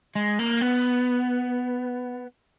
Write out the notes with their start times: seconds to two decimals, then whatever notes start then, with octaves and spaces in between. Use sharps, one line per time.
0.15 G#3
0.39 A#3
0.61 B3